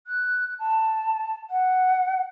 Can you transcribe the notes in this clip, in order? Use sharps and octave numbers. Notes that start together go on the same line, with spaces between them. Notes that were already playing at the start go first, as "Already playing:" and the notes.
F#6
A5
F#5